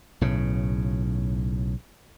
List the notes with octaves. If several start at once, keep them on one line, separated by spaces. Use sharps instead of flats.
B1 A2 C#3